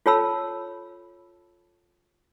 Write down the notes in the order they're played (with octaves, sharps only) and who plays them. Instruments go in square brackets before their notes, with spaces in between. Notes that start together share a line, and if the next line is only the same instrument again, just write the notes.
[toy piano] F4 A4 C#5 A5 B5 E6